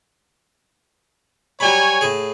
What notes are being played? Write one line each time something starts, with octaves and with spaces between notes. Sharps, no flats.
F#3 G3 C#5 G#5 B5
A2 G#4